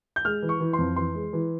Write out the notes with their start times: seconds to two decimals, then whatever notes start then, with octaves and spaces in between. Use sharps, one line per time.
0.16 G6
0.25 G#3 F6
0.43 E3
0.49 C#6
0.60 E3
0.73 F2 C6
0.96 E3 C6
1.15 G#3
1.33 E3